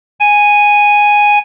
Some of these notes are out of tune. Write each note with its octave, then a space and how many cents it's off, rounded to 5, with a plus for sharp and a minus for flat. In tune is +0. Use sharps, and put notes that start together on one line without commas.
G#5 -5